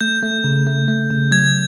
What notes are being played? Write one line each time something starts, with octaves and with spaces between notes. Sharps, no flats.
A3 G6
A3
C#3
A3
A3
C#3
F#3 G#6